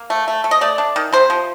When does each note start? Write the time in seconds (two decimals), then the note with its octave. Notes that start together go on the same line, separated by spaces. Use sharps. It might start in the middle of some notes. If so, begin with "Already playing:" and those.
Already playing: A#3
0.10 A3
0.28 A3
0.44 A3
0.51 D#5
0.61 A3 D5
0.78 D4
0.96 D#3
1.13 C3 C5
1.30 F3